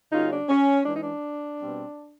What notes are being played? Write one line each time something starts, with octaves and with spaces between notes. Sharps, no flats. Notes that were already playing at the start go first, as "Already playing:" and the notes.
C#3 F#3 A#3 C#4 D#4 F4
D4
C#4
E3 G#3 C#4 D4
D#4
D4
B2 G3 C4